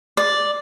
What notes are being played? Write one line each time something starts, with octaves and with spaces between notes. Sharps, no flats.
D5